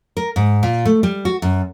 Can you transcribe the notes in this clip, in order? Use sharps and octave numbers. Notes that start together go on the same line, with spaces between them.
A#4
G#2
A#2
A3
G3
F#4
F#2